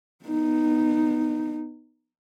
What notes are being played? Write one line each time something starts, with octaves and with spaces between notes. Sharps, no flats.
B3 D#4